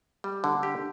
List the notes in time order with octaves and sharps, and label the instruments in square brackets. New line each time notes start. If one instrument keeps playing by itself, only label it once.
[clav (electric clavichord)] G3
D3
G4